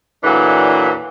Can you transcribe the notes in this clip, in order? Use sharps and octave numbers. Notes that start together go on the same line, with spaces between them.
E2 A#2 E3 F#3 D4 A4